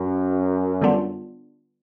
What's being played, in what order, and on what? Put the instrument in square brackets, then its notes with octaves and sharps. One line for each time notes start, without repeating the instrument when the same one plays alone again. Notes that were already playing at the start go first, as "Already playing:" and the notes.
Already playing: [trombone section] F#2
[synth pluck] D3 G3 B3 D4 F4